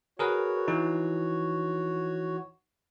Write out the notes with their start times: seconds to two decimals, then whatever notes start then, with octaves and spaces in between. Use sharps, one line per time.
0.19 F#4 G#4 A#4 B4 C#5
0.68 E3 D#4